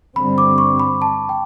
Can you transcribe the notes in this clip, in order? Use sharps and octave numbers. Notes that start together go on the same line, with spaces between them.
G2 D3 G3 C4 B5
D6
C#6
B5
A5
G5